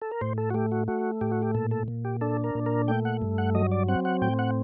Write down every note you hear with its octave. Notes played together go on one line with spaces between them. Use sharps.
A4
A#4
A2 C5
A4
F#4
A3 G4
F#4
A3 F#4
A2 G4
F#4
G4
A#2 A4
A4
A#2
G4
D4 A4
A#4
A#2
A#4
A3 G5
F#5
G2
F#5
F#3 D#5
D5
C4 F#5
F#5
A2 G5
F#5